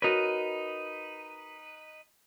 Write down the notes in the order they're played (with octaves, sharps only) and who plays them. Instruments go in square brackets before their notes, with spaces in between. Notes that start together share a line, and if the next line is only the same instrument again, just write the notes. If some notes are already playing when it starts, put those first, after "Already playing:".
[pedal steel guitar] D#4 B4 [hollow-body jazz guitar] F#4 A#4 C#5